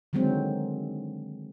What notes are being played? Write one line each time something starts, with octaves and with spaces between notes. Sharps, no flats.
D3 D#3 F#3 G#3 C4